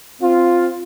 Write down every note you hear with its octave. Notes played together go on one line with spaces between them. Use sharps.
C4 F4